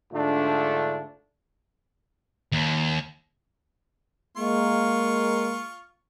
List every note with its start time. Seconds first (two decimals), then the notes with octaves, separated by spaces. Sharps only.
0.13 G#2 D3 A3 D4 F4
2.52 D#2
4.37 G#3 A#3 F4 C#6